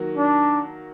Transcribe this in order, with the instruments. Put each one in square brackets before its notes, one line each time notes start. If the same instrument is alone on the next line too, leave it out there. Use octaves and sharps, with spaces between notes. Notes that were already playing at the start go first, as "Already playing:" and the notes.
Already playing: [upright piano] D#3 F#3 A#3 F#4
[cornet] D4